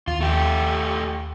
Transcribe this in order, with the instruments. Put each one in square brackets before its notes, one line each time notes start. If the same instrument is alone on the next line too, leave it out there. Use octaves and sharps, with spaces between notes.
[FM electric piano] D#2 [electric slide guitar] F4
[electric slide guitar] A3 G4